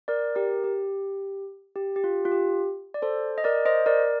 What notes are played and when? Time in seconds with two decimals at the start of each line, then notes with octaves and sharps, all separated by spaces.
0.08 A#4 D5
0.35 G4 A#4
0.64 G4
1.76 G4
1.96 G4
2.04 F4
2.25 F4
2.32 G4
2.94 D5
3.02 A4 C5
3.38 D#5
3.44 A#4 D5
3.65 C5 D#5
3.86 A#4 D5